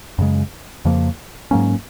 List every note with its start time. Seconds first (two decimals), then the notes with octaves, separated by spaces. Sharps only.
0.18 F#2 C#3 G#3
0.85 F2 C#3 F3 A#3
1.51 G#2 F#3 A#3 C#4